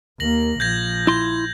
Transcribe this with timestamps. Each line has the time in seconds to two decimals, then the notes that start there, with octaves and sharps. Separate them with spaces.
0.20 D#2 A#3 A#6 F#7
0.60 A#1 F3 G6 G#6 A#6
1.07 E4 C6 G6